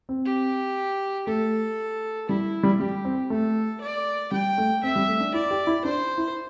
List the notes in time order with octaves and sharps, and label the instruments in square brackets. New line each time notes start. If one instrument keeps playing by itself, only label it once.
[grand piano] C4
[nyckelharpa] G4
[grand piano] A3 [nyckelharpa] A4
[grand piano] G3 [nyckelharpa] E4
[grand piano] G3
[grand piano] G3 [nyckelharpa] G4
[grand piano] C4
[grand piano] A3 [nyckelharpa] A4
[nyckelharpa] D5
[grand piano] G3 [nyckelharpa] G5
[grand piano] A3
[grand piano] C4 [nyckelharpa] E5
[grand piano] G3
A3
D4
[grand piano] E4 [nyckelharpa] D5
[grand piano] G4
E4
[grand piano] D4 [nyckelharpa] C5
[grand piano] E4